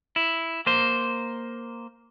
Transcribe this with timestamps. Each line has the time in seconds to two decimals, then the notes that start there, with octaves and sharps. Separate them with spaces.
0.16 E4
0.66 A#3 C5